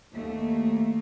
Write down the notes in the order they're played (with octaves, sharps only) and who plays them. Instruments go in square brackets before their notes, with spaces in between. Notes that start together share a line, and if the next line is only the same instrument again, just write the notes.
[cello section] D#2 A3 A#3